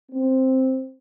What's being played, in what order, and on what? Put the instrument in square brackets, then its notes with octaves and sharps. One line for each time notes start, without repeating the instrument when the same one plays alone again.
[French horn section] C4